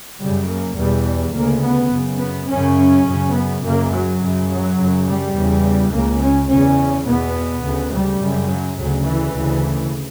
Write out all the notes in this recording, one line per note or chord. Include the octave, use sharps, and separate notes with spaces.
F#2 C#3 G3
A#3
E2 B2 G3
D2 C#3 A#3
B3
F#2 C#3
B3
F#2 C#3 C#4
F#2 C#3
B3
F#2 C#3 A#3
F#3
F#2 C#3
F#3
F#2 C#3
G3
E2 C#3
C#2 C#3 A#3
C#4
E2 C#3 C#4
E2 B2 B3
D2 C#3
G3
F#2 C#3
F#3
D2 C#3 F#3
E3
D2 C#3